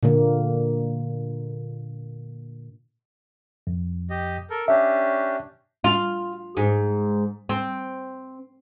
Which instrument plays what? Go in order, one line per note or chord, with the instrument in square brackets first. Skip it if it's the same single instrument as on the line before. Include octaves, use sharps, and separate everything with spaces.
[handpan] A#2 D3 A#3
[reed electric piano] F2
[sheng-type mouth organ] G4 D#5
A4 A#4
[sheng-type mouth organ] C#4 D4 G4 [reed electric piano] E5
[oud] F4
G#2
C4